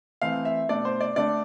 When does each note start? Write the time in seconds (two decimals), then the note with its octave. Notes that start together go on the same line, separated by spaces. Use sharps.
0.22 E3 A3 C4 F5
0.45 E5
0.69 B2 A3 D4 D5
0.85 C5
1.01 D5
1.16 D3 A3 D4 D5